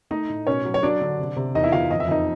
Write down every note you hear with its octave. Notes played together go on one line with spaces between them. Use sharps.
A3 D#4 D#5
A2
B2 C#4 C#5
F#3
C#5
F#3 D4 D5
D3
C3
C3
E2 D#4 D#5
E4 E5
E2 F4 F5
F2 D#5
E5
F2 D#4 D#5